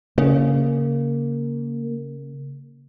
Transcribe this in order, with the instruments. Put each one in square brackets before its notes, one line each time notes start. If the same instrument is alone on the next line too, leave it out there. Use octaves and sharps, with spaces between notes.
[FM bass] C#3 [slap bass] A#3